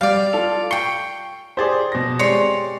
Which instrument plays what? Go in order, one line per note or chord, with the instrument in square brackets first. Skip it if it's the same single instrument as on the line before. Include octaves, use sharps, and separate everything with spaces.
[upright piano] G3 [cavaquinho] D5 F5
[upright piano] F4 A4 F7
[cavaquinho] G5 C#6 [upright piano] C7 G7
[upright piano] G4 G#4 D5 [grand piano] C5 A6
[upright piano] B2 A#6
[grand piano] G#3 G4 D5 [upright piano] C4 [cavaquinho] C#5 C6